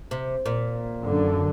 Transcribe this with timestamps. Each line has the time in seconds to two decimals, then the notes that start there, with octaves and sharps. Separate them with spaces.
0.11 C3
0.46 A#2
1.03 F#2 D3